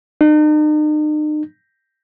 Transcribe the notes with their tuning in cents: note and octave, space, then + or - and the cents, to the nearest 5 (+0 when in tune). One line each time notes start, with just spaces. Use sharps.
D#4 -45